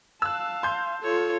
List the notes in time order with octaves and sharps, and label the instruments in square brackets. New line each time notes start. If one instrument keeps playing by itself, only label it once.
[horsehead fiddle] F5 A5 [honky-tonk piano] E6 F#6
[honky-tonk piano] C6 G6
[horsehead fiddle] F4 [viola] A4 C#5